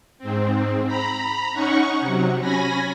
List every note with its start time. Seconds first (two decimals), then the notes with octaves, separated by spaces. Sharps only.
0.18 G#2 C4
0.87 A#5 B5
1.53 C#4 D#4 F#5 C#6
2.01 C3 F#3
2.40 C#4 G#5 B5 A#6